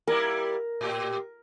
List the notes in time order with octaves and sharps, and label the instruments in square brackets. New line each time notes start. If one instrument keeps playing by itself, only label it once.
[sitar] G3 A#3 E4 [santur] A#4
[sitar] A2 G4